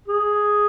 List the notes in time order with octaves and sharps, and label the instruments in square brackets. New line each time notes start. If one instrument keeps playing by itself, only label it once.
[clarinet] G#4